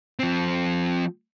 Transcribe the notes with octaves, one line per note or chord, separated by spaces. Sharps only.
F3 C4